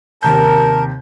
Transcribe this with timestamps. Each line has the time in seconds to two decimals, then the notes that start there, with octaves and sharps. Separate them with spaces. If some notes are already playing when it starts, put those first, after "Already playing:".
0.23 D#2 C3 A#4 A5 G6